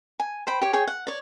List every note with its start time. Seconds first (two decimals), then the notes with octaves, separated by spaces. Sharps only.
0.20 G#5
0.47 C5 G5 B5
0.61 G4 C#5
0.73 G#4 C#5 G5
0.87 F#5
1.07 C#5 D5